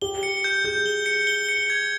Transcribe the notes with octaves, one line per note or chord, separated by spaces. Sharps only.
G4 G7
C#7
G6
G#4 G6
G7
C#7
G7
C#7
G#6